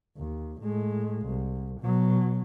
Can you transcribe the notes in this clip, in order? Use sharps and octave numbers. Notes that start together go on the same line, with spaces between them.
D#2
A2 G#3
C2
B2 F#3